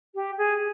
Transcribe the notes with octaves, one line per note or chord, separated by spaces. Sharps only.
G4
G#4